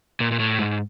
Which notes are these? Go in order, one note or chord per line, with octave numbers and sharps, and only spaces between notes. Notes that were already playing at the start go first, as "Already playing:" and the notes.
A#2
A#2
A2
G#2